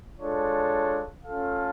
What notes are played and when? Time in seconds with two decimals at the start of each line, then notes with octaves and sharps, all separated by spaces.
0.17 G#3 D4 F4 A4 C#5
1.23 A3 C#4 F4 A4 F5